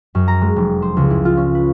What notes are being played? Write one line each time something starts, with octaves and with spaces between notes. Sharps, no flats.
F#2
A#5
G#3
F1
C5
C#2
E4
F4
C#4
B4